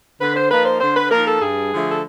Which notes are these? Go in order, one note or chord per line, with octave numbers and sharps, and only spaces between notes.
D3 B4
C5
F3 A#3 D#4 B4
C5
D3 C5
B4
F3 A#3 D#4 A#4
A4
G2 G#4
D3 F3 A3
A4